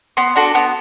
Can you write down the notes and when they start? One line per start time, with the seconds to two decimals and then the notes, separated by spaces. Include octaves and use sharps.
0.17 B3 C6
0.36 D4 F#4 A4
0.55 B3